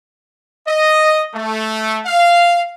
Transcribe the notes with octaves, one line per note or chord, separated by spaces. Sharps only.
D#5
A3
F5